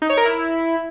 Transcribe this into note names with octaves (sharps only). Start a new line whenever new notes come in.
D#4
C#5
A#4
E4